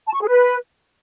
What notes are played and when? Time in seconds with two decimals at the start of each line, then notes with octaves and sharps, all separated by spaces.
0.07 A5
0.13 C#6
0.20 G#4
0.27 B4